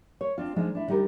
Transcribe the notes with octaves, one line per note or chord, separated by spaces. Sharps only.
C#5
C4 D4 F4
F3 G#3 D4 D#4
D4 E4
D3 G3 D#4 G4 A#4